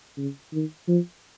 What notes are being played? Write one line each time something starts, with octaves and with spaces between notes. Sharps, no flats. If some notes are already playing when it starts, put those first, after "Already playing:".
C#3
D#3
F3